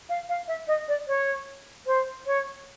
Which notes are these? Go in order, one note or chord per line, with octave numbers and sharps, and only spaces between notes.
F5
F5
E5
D#5
D5
C#5
C5
C#5